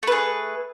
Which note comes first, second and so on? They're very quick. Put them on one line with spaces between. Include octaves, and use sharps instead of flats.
A3 B4 G#4